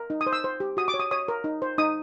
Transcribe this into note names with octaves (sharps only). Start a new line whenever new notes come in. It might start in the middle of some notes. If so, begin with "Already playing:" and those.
Already playing: A#4
D#4
D#6
C5
E6
C5
G4
F#4 D#6
D6
C#5
D#6
C#5 D#6
A#4
D#4
C5
D#4 D#6